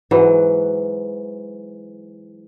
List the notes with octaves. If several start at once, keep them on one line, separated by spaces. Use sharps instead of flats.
G#2 E3 F#3